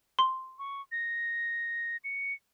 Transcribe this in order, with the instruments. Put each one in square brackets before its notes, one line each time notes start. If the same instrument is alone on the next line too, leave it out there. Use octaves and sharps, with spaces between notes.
[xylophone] C6
[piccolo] C#6
A#6
C#7